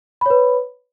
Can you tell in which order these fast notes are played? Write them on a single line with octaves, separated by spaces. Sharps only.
B5 C#5 B4